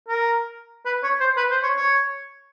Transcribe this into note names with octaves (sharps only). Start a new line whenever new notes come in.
A#4
B4
C#5
C5
B4
C5
C#5
C#5